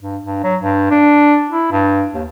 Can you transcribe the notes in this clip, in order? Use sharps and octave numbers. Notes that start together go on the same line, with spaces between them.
G2
G2
F#3
G2
D4
E4
G2
D#2